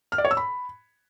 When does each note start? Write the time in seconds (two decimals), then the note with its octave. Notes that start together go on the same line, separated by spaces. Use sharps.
0.12 F6
0.18 D5
0.25 C#5
0.31 E6
0.37 B5